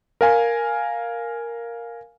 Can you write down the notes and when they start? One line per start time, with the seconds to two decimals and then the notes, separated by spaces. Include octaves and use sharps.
0.21 A#4 F5 G#5